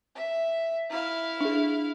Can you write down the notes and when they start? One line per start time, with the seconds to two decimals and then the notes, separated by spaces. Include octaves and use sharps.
0.15 E5
0.90 E4 F5
1.41 D4 G#4